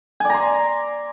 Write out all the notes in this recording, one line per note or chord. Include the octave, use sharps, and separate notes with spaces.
D5 G#5 A#5 C6